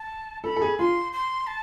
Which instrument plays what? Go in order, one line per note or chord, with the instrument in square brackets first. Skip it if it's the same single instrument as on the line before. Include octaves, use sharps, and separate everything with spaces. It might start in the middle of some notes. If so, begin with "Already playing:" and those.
Already playing: [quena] A5
[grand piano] A4 [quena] B5
[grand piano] A4
G#4
[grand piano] F4 [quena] C6
[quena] C6
A5